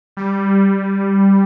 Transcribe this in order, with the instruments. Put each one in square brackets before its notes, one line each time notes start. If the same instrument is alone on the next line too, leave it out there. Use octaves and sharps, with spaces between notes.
[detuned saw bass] G3